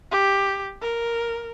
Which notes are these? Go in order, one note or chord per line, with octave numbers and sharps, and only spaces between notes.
G4
A#4